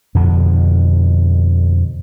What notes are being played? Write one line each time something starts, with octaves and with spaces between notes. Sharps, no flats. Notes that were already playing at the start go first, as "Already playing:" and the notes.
F2 B2 D3